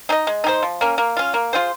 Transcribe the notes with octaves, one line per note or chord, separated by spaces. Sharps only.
D#4 G#4 D#5
G#3
D#4 G#4 C5
F3
A#3 C#4
A#3
C#4 F4
A#3
F4 G#4 C5